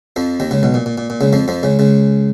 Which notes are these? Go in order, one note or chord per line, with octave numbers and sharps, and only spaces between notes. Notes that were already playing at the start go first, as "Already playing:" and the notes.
F2 F3
D#2 D#3
C#2 C#3
B1 B2
A#2
A#2
A#2
A#2
C#2 C#3
F2 F3
F2 F3
C#2 C#3
C#2 C#3